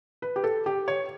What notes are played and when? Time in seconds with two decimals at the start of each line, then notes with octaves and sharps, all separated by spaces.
0.22 B4
0.36 G4
0.44 A4
0.66 G4
0.88 C#5